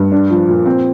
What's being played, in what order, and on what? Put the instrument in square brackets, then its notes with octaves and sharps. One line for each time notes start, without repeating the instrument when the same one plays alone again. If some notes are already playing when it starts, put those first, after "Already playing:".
Already playing: [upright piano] G2
D4
F3
A#2
C4